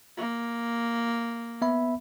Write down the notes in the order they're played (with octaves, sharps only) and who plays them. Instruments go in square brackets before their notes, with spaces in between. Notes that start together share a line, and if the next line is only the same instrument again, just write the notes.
[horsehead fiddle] A#3
[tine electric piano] B3 E5 B5